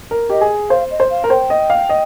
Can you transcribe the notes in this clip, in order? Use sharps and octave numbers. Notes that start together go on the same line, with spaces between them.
A#4
G4 D#5
G#4
C5 F5
D#5
C5
F5
A#4
C5 G5
D#5
F5
D#5